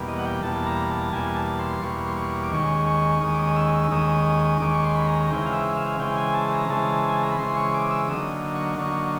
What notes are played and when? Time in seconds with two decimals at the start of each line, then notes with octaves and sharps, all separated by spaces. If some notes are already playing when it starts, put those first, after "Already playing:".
Already playing: E2 B2 G3 A#3
0.08 D#5
0.19 F#5
0.26 G5
0.43 E2 B2 G3 A#3 A5
0.66 A#5
0.90 A5
1.13 E2 B2 G3 A#3 G#5
1.35 A5
1.59 C6
1.82 E2 B2 G3 A#3 C#6
2.07 C6
2.17 C#6
2.43 D6
2.51 D#2 D#3 G#3 C#4 C#6
2.87 C#6
3.21 D#2 D#3 G#3 C#4 D#6
3.34 D6
3.39 D#6
3.56 E6
3.74 E6
3.91 D#2 D#3 G#3 C#4 D#6
4.60 D#2 D#3 G#3 C#4 D6
4.73 C#6
4.84 C6
4.96 B5
5.07 A#5
5.30 C#3 E3 G#3 C4 G5
5.46 F5
5.53 E5
5.76 F5
5.99 C#3 E3 G#3 C4 G5
6.17 G#5
6.35 A5
6.53 A#5
6.69 C#3 E3 G#3 C4 A5
7.09 G#5
7.16 A5
7.23 A#5
7.31 B5
7.38 C#3 E3 G#3 C4 C6
7.57 C#6
7.74 D6
7.91 E6
8.08 D3 F#3 A#3 D#4 D#6
8.55 C#6
8.78 D3 F#3 A#3 D#4 C#6